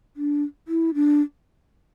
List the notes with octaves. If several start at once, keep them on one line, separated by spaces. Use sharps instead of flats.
D4
E4
D4